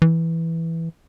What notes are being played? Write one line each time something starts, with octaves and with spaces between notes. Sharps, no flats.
E3